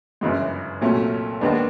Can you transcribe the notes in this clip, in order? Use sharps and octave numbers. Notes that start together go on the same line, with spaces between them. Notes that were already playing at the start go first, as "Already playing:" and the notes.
G1 F#2 C#3 E3 G#3
C2 A#2 F#3 A3 C#4
D#2 D#3 G#3 B3 D4